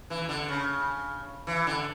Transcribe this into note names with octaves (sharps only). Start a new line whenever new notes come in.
E3
D3
C#3
E3
D3